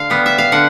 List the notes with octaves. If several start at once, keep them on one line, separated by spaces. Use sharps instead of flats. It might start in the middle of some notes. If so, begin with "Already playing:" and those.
Already playing: D3 F5
G3 B3
E5
F5
D3 F#5